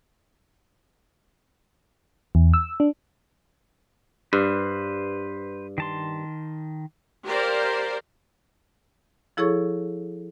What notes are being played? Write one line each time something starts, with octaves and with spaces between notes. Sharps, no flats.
E2
E6
D4
G2 B4 C5
D#3 A5 C6
G4 A#4 C5 D5 F5
F3 E4 G#4 A4 C#5 C#6